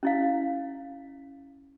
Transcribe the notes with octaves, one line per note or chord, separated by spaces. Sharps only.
C#4 E4 F5